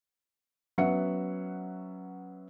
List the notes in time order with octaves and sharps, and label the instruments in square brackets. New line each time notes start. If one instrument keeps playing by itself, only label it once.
[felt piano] F#3 B3 C#4 E5 F#5 C#7